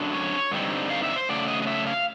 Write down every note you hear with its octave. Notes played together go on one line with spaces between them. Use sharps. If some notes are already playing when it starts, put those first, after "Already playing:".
Already playing: F#2 D3 F#3 D4
C#5
G2 D3 G3 C4 D#4
F5
E5
C5
C#3 F#3 A3 D5
D#5
D#5
E5
F5